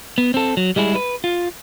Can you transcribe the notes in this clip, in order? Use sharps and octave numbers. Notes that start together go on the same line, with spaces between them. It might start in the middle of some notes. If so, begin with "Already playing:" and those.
B3
C4 A4
F#3
G3 G#3 E4 G#4
B4
F4